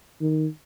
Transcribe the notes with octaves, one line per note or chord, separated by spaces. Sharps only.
D#3